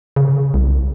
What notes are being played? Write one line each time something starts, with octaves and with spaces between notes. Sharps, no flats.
C#3
C2